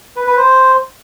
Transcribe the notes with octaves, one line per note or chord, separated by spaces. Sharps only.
B4
B4
C5